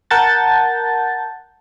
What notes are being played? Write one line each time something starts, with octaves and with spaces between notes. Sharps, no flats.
A#4 F#5 A5 G6 A6